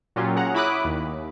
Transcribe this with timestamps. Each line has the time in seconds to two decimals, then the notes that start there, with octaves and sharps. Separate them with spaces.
0.16 A#2 F#3 C#4 F4 G4
0.35 C#4 G#4 F#5 A#5
0.55 E4 C#5 B5 D6 D#6 F#6
0.84 D#2